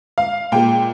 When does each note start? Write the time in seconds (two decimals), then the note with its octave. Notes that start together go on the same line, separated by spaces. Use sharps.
0.18 F5
0.52 A#2 G#3 G5